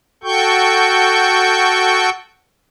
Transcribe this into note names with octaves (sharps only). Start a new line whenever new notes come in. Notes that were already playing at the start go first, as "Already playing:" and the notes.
F#4 A4 G5 C#6 G6